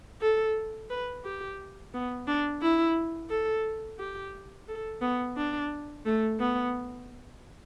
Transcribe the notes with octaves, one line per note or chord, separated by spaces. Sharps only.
A4
B4
G4
B3
D4
E4
A4
G4
A4
B3
D4
A3
B3